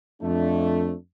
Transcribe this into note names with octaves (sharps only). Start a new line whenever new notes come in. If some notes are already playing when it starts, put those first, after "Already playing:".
F2 A3 D4